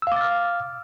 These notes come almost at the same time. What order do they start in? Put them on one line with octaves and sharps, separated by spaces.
E6 F5 D6 A6 F6